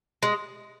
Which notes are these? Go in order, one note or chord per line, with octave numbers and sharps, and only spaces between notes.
G#3